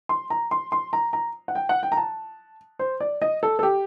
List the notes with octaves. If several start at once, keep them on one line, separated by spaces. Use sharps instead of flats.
C6
A#5
C6
C6
A#5
A#5
F#5
G5
F#5
G5
A#5
A5
C5
D5
D#5
A4
A4
G4